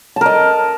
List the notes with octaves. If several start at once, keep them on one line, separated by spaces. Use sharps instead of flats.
A#4 D#5 A5